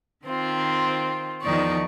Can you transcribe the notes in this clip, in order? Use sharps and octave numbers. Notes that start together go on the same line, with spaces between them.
D#3 C4 F4
E2 D#3 F3 D#4 D5 C#6